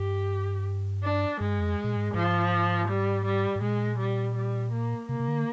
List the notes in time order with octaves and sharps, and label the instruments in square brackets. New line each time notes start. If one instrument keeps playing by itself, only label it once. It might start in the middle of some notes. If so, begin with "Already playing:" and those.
Already playing: [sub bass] G2 [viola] G4
[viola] D4
[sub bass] G2 [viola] G#3
[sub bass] F2
A#2
G#2
[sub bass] G#2 [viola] F3
[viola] G3
G3
[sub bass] G#2
[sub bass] A#2 [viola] G#3
[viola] G3
G3
A#3
[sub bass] C3 [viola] A#3
[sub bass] C3
D3